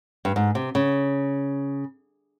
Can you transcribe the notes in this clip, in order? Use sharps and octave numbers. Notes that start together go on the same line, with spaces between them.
G2
G#2
C3
C#3